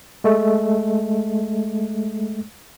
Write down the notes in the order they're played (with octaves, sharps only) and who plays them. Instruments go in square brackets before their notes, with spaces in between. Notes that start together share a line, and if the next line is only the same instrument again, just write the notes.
[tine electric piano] G#3 A3